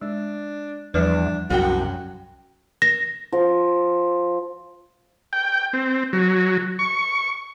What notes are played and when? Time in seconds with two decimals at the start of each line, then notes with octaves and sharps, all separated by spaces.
0.01 G#3 D4
0.94 E2 F3 G3 D4 B4
1.50 C2 F#2 F#4 G4 G5
2.82 A#6
3.32 F3
5.33 G5
5.73 C4
6.13 F#3
6.79 C#6